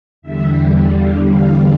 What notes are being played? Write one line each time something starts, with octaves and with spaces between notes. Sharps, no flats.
E2 D3 G3 E5
F5
F5